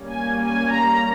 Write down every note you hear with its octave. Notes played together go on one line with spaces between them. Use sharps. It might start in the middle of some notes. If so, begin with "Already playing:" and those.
Already playing: G3 A#3 C#4
G#5
G#5
A#5